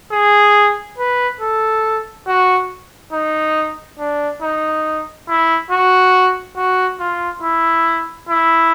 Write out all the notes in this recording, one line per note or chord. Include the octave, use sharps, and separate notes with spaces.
G#4
B4
A4
F#4
D#4
D4
D#4
E4
F#4
F#4
F4
E4
E4